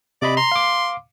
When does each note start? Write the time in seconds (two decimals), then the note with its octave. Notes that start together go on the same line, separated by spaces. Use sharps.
0.22 C3 D5 D#5 B5
0.37 A#5 C6
0.52 F5 D6